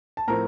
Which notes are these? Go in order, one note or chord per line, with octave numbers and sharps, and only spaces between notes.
A5
A2 F3 C4 A#4 A#5